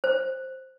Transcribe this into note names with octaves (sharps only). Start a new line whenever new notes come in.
C5